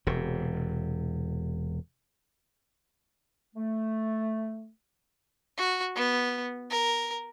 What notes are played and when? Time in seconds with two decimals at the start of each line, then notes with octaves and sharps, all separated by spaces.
0.07 E1 C3
3.56 A3
5.57 F#4
5.95 B3
6.71 A#4